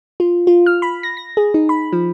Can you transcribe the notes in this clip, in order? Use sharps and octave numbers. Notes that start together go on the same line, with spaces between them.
F4
F4
F6
B5
A#6
A#6
G#4
D#4
B5
F3